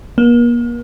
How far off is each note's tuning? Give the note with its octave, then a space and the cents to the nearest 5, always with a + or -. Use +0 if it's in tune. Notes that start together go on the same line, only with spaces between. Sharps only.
A#3 +40